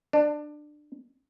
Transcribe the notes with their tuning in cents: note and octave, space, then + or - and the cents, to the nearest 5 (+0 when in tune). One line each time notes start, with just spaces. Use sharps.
D4 +20